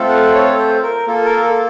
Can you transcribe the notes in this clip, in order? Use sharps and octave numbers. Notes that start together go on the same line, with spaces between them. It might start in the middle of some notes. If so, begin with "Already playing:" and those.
Already playing: A3 C4 F4 A4
F#5
C#5
C5
A#4
A#3 F4 A4
A#4
A4